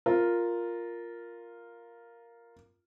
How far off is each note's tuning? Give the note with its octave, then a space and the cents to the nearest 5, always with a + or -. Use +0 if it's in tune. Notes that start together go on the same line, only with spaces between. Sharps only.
F4 +0 A#4 +0